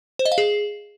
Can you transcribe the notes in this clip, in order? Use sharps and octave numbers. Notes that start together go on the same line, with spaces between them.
C5
D#5
F5
G#4